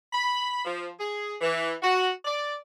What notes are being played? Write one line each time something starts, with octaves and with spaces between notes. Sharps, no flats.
B5
F3
G#4
E3
F#4
D5